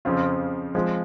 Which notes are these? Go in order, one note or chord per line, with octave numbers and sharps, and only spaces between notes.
F2 C#3 F3 C4 F4
F3 G#3 C4